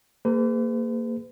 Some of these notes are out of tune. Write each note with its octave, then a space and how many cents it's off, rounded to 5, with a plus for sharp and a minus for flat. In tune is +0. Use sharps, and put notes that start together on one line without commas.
A#3 -20 G#4 -5 B4 +45